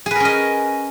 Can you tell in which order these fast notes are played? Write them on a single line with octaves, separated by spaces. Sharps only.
G#4 B4 A#4 C#4 D#5